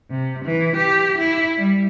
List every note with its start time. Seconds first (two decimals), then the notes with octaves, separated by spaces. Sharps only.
0.11 C3
0.45 E3
0.77 G4
1.19 E4
1.57 G3